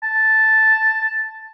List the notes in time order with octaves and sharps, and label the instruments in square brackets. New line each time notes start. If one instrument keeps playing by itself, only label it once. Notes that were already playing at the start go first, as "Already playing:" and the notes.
[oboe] A5